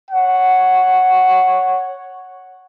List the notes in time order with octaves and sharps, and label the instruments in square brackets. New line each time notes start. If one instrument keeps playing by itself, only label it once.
[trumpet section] C#5 F#5